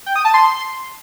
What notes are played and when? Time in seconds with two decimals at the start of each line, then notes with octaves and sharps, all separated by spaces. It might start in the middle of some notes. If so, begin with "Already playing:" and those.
0.06 G5
0.16 D#6
0.25 A5
0.34 C6